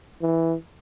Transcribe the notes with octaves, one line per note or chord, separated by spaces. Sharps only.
E3